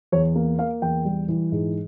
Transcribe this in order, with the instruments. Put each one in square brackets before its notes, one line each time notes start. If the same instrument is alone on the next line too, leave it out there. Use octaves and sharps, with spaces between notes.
[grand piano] E2 C#5
A#3
A#3 F5
E2 G5
G3
E3
G#2